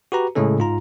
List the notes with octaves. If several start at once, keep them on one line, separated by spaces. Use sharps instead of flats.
F#4 G4 B4 A#5
A2 C#3 G#3 C#4 A4
G#2 F4 A#5